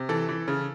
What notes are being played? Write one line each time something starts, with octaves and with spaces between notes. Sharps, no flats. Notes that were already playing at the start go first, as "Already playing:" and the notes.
Already playing: C3
E3 A4
E3
C#3